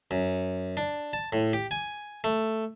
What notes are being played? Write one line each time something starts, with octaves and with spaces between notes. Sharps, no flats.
F#2
D4
A5
A2
G4
G#5
A3